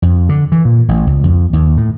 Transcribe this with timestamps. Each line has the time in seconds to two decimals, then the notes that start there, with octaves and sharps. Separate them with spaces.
0.02 F2
0.29 D3
0.52 E3
0.65 A#2
0.89 A1
1.07 C#2
1.23 F2
1.53 D#2
1.77 A2